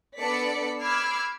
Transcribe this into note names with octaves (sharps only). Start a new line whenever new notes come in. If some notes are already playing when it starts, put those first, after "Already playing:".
B3 D4 A4 D5 B6 C#7
B5 D6 E6 F6 G#6 C7